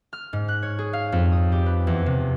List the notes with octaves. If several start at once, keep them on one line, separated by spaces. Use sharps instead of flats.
F6
G#2
F#6
C#5
G#4
F5
F2
D#6
G4
B4
E2
C3